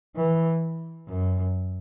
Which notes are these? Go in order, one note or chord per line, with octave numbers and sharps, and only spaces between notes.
E3
F#2